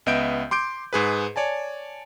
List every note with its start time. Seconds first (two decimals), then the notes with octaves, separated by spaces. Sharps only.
0.06 C#2 B3 D#5 E5 G6 D7
0.51 C6 D6 G6 D7
0.93 G#2 G#4 B4
1.36 C#5 D5 G#5 A5